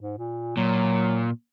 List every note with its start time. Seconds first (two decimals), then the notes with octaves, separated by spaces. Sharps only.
0.02 G#2
0.18 A#2
0.57 A#2 F#3